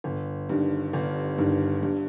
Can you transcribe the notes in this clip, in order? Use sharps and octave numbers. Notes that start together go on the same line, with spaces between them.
G1
G2 D#3
G1
G2 D#3
G2